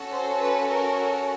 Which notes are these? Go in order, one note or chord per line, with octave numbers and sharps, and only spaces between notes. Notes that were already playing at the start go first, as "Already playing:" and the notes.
Already playing: C#4 F#4 A4
C5
B4
A#4